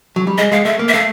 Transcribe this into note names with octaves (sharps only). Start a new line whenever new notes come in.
F#3
G3
G#3 D#5
G#3 F5
A3 E5
A#3
E5
A3 F5